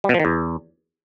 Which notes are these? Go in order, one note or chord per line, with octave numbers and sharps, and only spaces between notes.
G3
B2
F3
D#3
E2